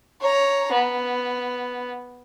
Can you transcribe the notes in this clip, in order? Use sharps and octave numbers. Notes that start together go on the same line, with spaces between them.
C#5 A#5
B3